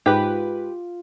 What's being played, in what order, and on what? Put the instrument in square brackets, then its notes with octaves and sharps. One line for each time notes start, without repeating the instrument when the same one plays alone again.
[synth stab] G#2 B4 [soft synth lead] F4 [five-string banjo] G4